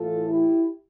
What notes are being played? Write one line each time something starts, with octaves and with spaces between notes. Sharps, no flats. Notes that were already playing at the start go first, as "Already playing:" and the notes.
Already playing: A2 E3 F4 A4
E4 G4